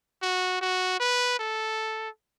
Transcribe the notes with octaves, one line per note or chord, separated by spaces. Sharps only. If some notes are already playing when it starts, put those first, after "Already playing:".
F#4
F#4
B4
A4